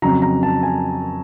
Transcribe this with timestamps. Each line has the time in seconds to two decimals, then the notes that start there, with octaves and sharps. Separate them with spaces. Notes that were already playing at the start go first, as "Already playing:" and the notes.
0.02 F2 C#3 F#3 A#5
0.22 A#5
0.43 A5
0.63 G#5